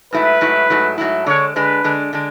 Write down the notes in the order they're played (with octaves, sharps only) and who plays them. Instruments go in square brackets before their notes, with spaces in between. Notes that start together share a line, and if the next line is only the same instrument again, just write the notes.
[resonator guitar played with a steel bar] G#2 F#3 A3 E4 [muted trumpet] B4
[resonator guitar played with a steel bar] G#2 F#3 A3 E4
G#2 F#3 A3 E4
G#2 F#3 A3 E4
[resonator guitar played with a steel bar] D3 G#3 D4 [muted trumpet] C#5
[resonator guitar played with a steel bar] D3 G#3 D4 [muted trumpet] B4
[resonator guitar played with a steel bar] D3 G#3 D4
D3 G#3 D4